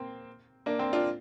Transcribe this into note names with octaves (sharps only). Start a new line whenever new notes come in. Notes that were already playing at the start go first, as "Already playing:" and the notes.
Already playing: A#3 C4
A#3 D4
C4
D4 F4